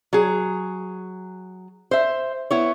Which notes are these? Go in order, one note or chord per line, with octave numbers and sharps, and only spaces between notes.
F#3 G#4
C5 E5
B3 E4 C#5